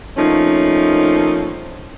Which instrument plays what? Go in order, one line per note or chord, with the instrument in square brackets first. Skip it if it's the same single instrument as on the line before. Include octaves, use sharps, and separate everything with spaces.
[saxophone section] F3 A3 A#3 C4 C#4 D#4